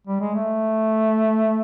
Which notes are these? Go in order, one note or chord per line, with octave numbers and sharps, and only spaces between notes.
G3
G#3
A3